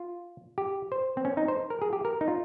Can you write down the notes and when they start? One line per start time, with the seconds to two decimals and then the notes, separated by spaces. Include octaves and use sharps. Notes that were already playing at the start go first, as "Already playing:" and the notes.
Already playing: F4
0.58 G4
0.92 C5
1.17 C4
1.25 C#4
1.37 D#4
1.48 C5
1.70 A#4
1.82 G#4
1.93 G4
2.05 A#4
2.21 D#4
2.28 F4